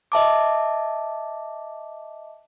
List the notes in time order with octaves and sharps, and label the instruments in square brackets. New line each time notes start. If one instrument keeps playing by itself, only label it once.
[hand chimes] D#5 E5 A5 D6